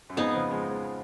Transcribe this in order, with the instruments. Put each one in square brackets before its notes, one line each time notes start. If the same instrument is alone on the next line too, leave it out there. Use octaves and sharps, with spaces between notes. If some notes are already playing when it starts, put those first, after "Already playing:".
[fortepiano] F#2
[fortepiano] F2 G#2 [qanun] B3 D#4 G#4
[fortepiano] C#3 F3
F3 G#3
F3 G#3